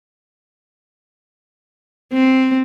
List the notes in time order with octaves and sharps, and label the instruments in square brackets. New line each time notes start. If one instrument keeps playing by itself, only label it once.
[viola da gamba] C4